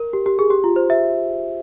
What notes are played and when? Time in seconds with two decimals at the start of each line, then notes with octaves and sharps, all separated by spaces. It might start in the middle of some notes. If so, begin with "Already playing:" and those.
Already playing: A#4
0.13 G4
0.26 G4
0.39 G#4
0.50 G4
0.64 F4
0.76 C5
0.90 E5